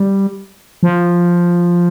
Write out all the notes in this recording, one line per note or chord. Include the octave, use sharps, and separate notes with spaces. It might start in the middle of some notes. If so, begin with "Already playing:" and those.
Already playing: G3
F3